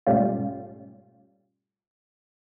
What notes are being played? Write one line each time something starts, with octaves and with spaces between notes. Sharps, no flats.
G#2 B2 G3 A3 C#4 F4